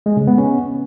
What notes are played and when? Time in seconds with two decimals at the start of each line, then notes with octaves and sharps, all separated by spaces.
0.06 G#3
0.17 C#3
0.27 B3
0.38 C#4